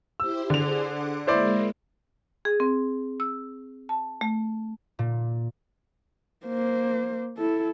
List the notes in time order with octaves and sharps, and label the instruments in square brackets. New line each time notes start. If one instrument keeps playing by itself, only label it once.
[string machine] E4 G4 C5 [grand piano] E6
[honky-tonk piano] D3 F7 [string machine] G#4 C5
[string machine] F#5 D6
[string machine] G#3 A#3 [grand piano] E4 C5 D5
[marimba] G#4
C4
E6
A5
A3
[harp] A#2
[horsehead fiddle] A#3 C5
E4 A4